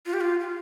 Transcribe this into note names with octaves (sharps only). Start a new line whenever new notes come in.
F4
G4
F4
F4